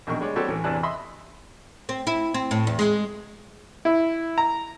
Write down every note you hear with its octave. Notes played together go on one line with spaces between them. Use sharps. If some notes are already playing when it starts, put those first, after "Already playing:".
A#1 B2 D#3 A#4 C#6
G3 G#3 C#5 D5
G3 C4 F#4 G4 A4 C#5
A1 E3
E2 C3 E3 D4 A5 F#6
D#5 E5 B5 C6
C4
E4
C4
A2
E2
G#3
E4
A#5